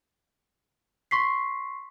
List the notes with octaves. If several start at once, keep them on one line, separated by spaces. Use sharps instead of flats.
C6 C#6 B6 C7